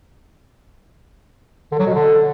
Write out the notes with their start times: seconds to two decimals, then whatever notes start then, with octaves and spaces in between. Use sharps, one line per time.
1.72 D3
1.79 F#3
1.87 B2
1.94 D3